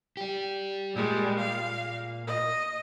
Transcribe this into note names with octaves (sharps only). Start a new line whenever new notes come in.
G3 G4
A#2 G3 G#3 A#3
F5
D#5